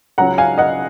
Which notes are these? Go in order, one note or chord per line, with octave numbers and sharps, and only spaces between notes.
C#2 C#3 F#3 C#4 F#5 A#5
F5 G#5
D#5 F#5